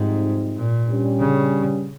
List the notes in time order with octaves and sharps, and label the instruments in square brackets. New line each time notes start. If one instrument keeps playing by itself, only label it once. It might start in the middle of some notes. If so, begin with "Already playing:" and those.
Already playing: [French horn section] F2 C3 G3 C4 D#4 [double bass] G#2
[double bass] A#2
[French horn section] G2 G3 C#4
[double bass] C#3